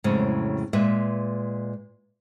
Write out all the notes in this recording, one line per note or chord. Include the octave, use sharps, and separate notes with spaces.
F2 A2 C#3 F#3 G#3
A#2 G#3 B4 E5